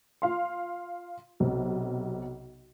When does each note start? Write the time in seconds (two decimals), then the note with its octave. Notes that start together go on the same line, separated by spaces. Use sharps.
0.22 F4 F5 C6
1.40 B1 C3